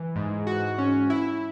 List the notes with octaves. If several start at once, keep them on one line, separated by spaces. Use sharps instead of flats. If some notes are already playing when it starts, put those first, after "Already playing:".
Already playing: E3
G#2
F#4
C#4
E4